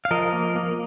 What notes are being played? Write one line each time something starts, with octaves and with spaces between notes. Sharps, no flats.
F5
F3 A#4 D#5
A#3
A#3